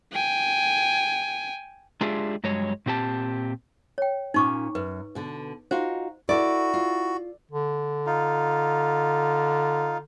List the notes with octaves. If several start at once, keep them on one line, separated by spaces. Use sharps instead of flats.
G5 G#5
G#3 D4 F4 G4 G#4 E5
G2 F#3 G#3 C#5
A#2 C4 G4 A5
C#5 G5
A#2 C#4 D#4 C#6 D6
F#2 B4
B2 D3
D#4 F4 F#4 C5
E4 F#4 A4 D5
F4
D3
D#4 F4